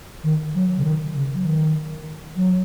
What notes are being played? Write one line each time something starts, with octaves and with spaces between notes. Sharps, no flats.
D#3
F#3
C#3
D#3
C#3
F#3
D#3
F#3